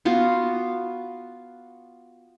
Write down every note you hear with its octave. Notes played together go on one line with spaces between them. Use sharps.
B3 F4 F#4